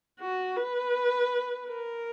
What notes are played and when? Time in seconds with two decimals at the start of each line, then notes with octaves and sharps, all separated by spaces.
0.20 F#4
0.56 B4
1.68 A#4